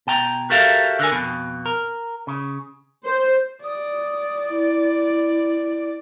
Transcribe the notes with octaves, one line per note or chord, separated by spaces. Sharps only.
B2 G5 A#5
F#4 G4 A4 A#4 E5 F5
D3 A#4 G#5
F2 B2
A#4
C#3
C5
D5 D#6
E4